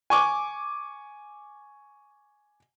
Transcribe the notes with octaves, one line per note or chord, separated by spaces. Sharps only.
G#5 C#6 D6